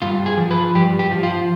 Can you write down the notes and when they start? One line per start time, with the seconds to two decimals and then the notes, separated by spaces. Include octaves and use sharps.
0.02 G2 F4
0.26 G#4
0.38 F3
0.51 B4
0.75 G2 G4
0.99 G4
1.11 F3
1.23 F4